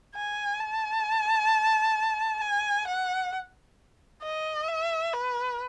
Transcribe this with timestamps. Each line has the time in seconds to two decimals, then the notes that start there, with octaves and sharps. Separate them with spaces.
0.16 G#5
0.60 A5
2.41 G#5
2.88 F#5
4.23 D#5
4.68 E5
5.13 B4